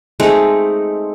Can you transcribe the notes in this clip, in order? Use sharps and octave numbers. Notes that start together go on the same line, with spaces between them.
G#3 A3 C4 D#4